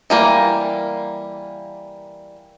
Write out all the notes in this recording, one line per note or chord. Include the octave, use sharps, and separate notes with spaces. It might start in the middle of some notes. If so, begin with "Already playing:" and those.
E3 G3 A#3